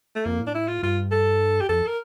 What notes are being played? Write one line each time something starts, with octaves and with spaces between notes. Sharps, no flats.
A3
F2 A#3
A2
D4
E4
F4
G2 F4
A4
G4
F2 A4
A#4